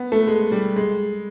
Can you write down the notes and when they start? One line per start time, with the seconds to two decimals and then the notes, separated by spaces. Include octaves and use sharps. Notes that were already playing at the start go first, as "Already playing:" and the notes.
Already playing: B3
0.12 A3
0.27 G#3
0.52 G3
0.76 G#3